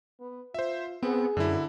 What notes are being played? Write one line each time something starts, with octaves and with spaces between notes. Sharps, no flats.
B3
F4 C5 E5
B3 C4 G#4
F#2 D3 E4